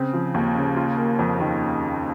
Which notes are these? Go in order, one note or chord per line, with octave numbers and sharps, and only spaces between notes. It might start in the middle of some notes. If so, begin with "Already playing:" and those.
Already playing: C#3 C4
F3
D#2
C#3
F4
A#3
F2
D#3